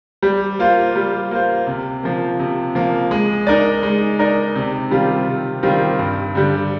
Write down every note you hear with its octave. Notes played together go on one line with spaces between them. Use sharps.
G3
A#3 F4 C5
G3
A#3 F4 C5
C3
F3 A#3
C3
F3 A#3
G#3
D#4 A#4 D5
G#3
D#4 A#4 D5
C3
D#3 G3 C4 F4
C3
D#3 G3 C4 F4
G2
D3 G3